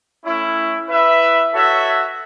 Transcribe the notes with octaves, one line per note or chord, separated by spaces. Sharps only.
A3 C#4 E4
E4 B4 E5
F#4 A4 C#5 E5